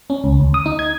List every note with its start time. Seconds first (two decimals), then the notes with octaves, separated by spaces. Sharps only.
0.10 C#4
0.24 C#2
0.39 D2
0.54 D#6
0.66 D#4
0.79 G#6